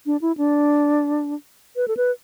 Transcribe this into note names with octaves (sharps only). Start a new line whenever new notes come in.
D4
E4
D4
B4
A4
B4